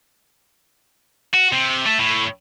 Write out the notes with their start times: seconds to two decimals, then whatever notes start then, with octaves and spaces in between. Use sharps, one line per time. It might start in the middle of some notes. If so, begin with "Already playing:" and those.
1.34 F#4
1.53 C3
1.86 A3
1.99 A2